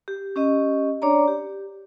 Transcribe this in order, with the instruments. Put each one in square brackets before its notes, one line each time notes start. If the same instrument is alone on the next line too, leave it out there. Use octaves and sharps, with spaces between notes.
[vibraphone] G4
C#4 G4 D#5
D4 C#5 D5 A#5
G4